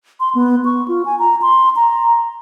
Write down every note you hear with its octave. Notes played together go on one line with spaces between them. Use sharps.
C6
B3
C#6
F4
G#5
A#5
C6
A#5